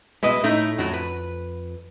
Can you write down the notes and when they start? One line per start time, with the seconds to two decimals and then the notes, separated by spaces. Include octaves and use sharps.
0.23 B2 G#3 E4 B4 D#5
0.44 A2 A3 D#4 E4
0.78 F2 A2 F#3
0.93 B4